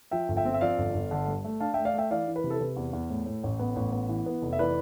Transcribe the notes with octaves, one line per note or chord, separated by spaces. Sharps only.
F3 E5 G5
G1
E5 G5
C4
E5
F3 D5 F5
G1
G1
D3
G2
A3
D4 F5 A5
E5 G5
A3
D5 F5
A3 E5 G5
E3 D5 F5
E3
B4
C3
A4
C3 B4
E2
E2
A2
A2
A1
B3
A1
B3
E3
B3
F1
E5
E3 B4 D5